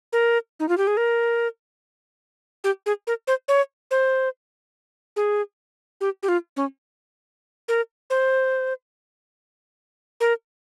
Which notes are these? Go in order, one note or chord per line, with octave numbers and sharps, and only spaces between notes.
A#4
D#4
F4
G4
G#4
A#4
G4
G#4
A#4
C5
C#5
C5
G#4
G4
G4
F4
C#4
A#4
C5
A#4